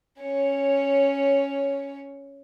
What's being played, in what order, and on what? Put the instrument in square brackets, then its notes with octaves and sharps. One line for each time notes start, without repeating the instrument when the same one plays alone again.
[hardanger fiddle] C#4 C#5